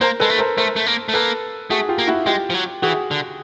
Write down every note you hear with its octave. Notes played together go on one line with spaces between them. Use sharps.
A#3 A#4 C5
G#3 A4 B4
A3
A#4 C5
A3 A#4 C5
A3
A#3
A3
A#3 A4 B4
A3 F#4 G#4
F4 G4
A#3
E4 F#4
G#3 F4 G4
F3
F#3
E3 F#4 G#4
D3